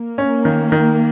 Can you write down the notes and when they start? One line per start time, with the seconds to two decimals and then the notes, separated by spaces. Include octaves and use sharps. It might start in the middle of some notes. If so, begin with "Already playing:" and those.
Already playing: A#3
0.18 C#4
0.45 D#3
0.72 D#3